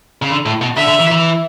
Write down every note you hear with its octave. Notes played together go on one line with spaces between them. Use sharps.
C#3
D3
A2
B2
D3 E5
D3
E3
E3